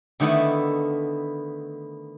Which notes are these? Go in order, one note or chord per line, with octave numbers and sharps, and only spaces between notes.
D3 D#3 A3 B3 E4 A4